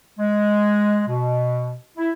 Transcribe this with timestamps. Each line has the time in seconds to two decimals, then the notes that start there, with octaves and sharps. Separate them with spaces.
0.19 G#3
1.07 B2
1.97 E4